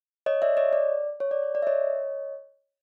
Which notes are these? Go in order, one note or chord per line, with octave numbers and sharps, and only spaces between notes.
C#5 D#5
D5 E5
C#5 D#5
D5
C#5
D5
C#5
D5
E5
C#5 D#5